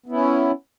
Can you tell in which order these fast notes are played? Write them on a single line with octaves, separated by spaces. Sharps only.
B3 E4 C#4